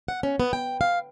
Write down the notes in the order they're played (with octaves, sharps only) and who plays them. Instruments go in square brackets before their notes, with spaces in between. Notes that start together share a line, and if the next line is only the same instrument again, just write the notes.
[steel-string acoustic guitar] F#5
C#4
B3
G5
F5